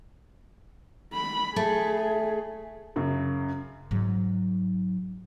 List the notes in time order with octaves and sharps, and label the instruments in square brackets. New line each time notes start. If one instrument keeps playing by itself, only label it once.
[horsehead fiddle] B5
[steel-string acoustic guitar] A3 [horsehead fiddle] G#4
[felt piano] F#2 C#3
[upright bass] G#2 F#3